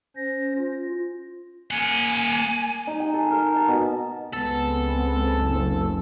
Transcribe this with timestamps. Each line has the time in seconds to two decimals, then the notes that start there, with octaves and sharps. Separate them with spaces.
0.16 C#4 C5 A#6
0.57 F4
1.71 A#3 F#5 G#5
2.87 D#4
3.00 G#5
3.14 A4
3.31 A#4
3.56 A5
3.68 B2
4.33 C#2 G#3 B3 C4 A4
5.39 F#1